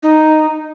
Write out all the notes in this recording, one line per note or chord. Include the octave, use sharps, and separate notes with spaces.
D#4